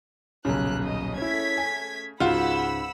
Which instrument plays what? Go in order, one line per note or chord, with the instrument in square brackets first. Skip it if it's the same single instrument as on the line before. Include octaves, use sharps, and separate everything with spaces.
[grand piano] D#1 B1 [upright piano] C#3 [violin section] F#6
[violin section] D#5
[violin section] A3 G#6 B6 [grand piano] C#4 E4
[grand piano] G#5
[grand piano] C#2 G#2 [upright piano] F4 F#4 [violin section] F#5 B5 E6